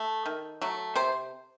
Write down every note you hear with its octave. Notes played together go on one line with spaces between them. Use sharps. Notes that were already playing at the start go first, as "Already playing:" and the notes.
Already playing: A3
D#3
F#3 A3
C3 C5